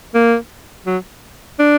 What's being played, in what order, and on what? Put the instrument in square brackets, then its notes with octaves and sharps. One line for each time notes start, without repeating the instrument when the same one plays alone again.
[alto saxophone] A#3
F#3
D4